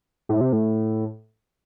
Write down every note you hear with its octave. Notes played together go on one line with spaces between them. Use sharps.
A2
C3
A2